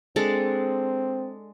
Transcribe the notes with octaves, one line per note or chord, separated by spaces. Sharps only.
G#3 C4 D4 A4